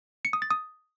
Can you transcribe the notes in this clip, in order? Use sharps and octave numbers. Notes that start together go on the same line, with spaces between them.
C#7
D#6
A6
D#6